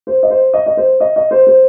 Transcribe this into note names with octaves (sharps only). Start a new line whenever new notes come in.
C5
D#5
C5
D#5
D#5
C5
D#5
D#5
C5
C5